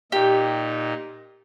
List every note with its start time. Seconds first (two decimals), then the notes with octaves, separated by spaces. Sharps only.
0.12 A#2 D#4 G4